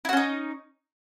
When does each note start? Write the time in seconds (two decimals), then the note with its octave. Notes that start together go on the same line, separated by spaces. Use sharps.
0.05 E4
0.09 F#4
0.13 C#4
0.17 D#4